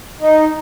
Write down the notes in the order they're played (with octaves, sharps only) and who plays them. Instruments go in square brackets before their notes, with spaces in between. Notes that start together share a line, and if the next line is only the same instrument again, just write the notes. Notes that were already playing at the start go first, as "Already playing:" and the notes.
[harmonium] D#4